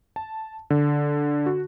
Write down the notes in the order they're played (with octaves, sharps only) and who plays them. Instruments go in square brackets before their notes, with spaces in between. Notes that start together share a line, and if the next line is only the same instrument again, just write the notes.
[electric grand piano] A5
D3
F#4